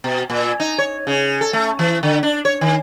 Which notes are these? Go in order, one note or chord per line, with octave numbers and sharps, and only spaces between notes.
B2
A#2
D#4
C#5
C#3
A4
A3
E3
D3
D4
C#5
D#3